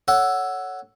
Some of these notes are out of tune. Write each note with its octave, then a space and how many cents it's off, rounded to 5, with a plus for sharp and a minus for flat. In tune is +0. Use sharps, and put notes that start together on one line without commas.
A4 +0 C#5 +5 F#5 +0